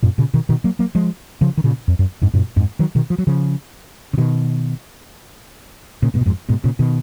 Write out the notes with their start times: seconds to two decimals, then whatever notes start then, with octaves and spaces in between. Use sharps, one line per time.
0.03 F#2 A#2
0.18 A#2 C#3
0.34 B2 D#3
0.49 B2 D#3
0.64 F#3 A#3
0.79 F#3 A#3
0.95 F3 G#3
1.41 C#3 F3
1.57 D#3
1.64 A#2 C#3
1.88 F2
1.99 F#2
2.21 F2 G#2
2.33 F#2 A#2
2.56 F2 G#2
2.79 D#3 F#3
2.95 B2 D#3
3.10 F3
3.18 F#3
3.27 C#3 F3
4.13 C#3
4.17 B2 D#3
6.02 A#2 C#3
6.14 G#2 B2
6.21 A#2
6.26 F2 G#2
6.49 G#2 B2
6.64 A#2 C#3
6.79 B2 D#3